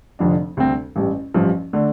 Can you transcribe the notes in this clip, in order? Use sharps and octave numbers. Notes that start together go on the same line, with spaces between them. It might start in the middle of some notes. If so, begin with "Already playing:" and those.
F1 F2 D3 F3 D4
D2 C3 G3 C4
A1 G2 G3
A1 G2 F3
D3 A3 D4